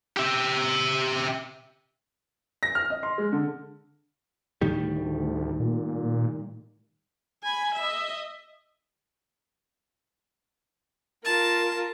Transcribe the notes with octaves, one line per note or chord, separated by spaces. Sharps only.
G4 E5
A#6
F6
D#5
C6
G#3
D3
D2 A2 D#3 G3
A#2
G#5 B5
D#5 E5
F4 A#4 A5